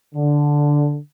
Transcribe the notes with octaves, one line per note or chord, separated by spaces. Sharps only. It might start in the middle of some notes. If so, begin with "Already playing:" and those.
D3